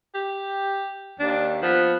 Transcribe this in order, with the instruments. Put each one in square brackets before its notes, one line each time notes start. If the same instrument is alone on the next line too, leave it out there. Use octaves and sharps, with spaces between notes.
[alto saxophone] G4
[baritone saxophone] D#2 [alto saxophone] D4
[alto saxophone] F3 [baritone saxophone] B3